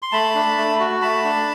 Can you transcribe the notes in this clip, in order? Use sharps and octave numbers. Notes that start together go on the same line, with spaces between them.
C6
A3 A5 B5
D4
A3
F#4
A3 A5 B5
D4